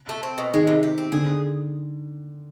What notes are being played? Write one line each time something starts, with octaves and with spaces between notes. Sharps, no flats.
A3
C4
B2
D#3 G#3
C3
G4
C4
D3 G#4